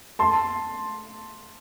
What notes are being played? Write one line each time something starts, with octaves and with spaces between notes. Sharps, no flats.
A5 C6